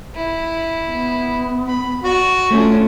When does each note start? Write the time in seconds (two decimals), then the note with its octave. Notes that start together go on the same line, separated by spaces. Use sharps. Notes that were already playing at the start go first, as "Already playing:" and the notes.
0.16 E4
0.87 B3
1.68 B5
2.04 F#4 D5
2.51 A3 C#4 D4 F4